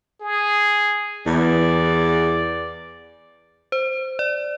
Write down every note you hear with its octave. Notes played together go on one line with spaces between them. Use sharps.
G#4
E2 D5
C5
D5